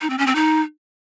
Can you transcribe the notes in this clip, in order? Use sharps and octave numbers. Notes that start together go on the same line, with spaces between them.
D#4
C4
C#4
C4
D#4